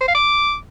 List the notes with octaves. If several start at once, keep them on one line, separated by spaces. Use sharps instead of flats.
C5
F5
D6